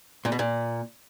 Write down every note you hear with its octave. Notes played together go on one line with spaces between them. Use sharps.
A#2
B2
A#2